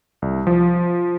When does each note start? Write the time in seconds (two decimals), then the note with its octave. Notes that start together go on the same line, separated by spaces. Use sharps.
0.22 C2
0.47 F3